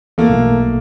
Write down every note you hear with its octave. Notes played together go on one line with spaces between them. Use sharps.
E2 A3 A#3
B1